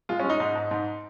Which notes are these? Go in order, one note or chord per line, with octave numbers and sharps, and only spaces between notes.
G#3 F4
C#4
G#3
D#4
G#2 D#4
G#2
G#2